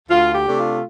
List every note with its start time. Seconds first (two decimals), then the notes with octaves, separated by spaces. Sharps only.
0.09 D2 F4
0.33 G4
0.46 C3 A3 D4
0.57 F4